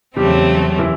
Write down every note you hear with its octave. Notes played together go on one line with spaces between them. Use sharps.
E2 C#3 F#3 G3 A3 C4 G4
E3 E4